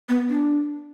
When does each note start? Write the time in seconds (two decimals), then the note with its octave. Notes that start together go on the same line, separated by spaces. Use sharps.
0.09 B3
0.29 D4